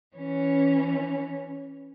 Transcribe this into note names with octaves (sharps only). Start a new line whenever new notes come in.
E3 C#4